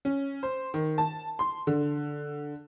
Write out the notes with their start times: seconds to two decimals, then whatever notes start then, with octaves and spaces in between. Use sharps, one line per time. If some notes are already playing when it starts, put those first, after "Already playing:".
0.05 C#4
0.43 C5
0.74 D#3
0.98 A5
1.39 C6
1.67 D3